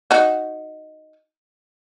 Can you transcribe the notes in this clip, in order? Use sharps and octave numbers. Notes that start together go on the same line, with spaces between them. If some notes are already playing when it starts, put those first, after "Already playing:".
D#4 F#4